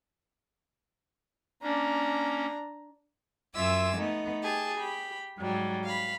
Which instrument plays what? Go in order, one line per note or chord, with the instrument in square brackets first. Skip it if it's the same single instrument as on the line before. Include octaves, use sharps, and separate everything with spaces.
[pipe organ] A#3 C#4 [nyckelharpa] D4 A#5
[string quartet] F#2 F4 E5 G#5 D6 E6
A3 B3 D#4
G4 G#4 A5
G4 B5
G#2 F#3 G3
F5 B5